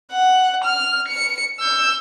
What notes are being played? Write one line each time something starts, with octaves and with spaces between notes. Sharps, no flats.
F#5
F6
C#7
E6 G6